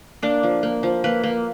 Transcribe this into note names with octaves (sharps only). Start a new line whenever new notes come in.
A#3 D4
F3
A#3
F3
A#3 B4
A#3